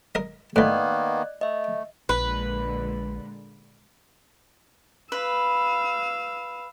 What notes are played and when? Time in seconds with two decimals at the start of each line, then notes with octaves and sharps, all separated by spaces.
0.15 A#4 D#5
0.56 A2 D#3 E3 A#3 B3 D5 D#5 F#6
1.41 A3 D#5 E5
2.09 A#1 A#2 D3 G#3 B4
5.12 B4 F5 E6